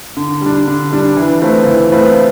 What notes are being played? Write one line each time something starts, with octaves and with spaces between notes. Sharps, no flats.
D3
G3 D4
D3
G3 D4
E3
A3 C4 F4 B4
E3
A3 C4 F4 B4